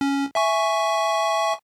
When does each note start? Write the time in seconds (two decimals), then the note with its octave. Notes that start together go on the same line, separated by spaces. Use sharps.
0.01 C#4
0.35 E5 G#5 C#6